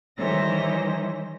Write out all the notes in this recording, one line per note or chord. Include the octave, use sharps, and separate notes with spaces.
D#3 E3 G3 C5 C#5 A#6